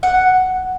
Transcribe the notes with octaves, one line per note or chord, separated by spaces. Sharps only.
F#5